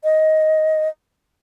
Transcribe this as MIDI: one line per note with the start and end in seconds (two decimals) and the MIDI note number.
0.04 0.89 75